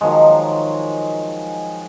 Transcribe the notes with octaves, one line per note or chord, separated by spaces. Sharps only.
D#3 F3 F#3 G#3